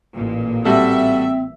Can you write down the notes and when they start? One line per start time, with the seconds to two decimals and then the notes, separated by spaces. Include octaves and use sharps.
0.14 A1 A#2
0.65 G3 C4 F#4 A4 E5